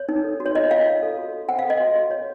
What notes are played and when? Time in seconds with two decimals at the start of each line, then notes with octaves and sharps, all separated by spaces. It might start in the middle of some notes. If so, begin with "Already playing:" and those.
Already playing: C#5
0.09 D#4
0.24 A4
0.40 F#4
0.46 C#5
0.55 F4 D#5
0.71 F4 F5
0.87 C#5
1.02 A4
1.18 F#4
1.33 F#4
1.49 C5 F#5
1.59 F5
1.65 A4
1.70 D#5
1.80 F#4
1.95 F#4
2.11 C#5